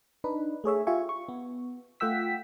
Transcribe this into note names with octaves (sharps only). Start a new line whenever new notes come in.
D4 D#4 B4
A3 G#4 C#5 E5
F4 G4 E5 G#5 C#6
C#6
B3
A3 F4 F#5 G5 E6 B6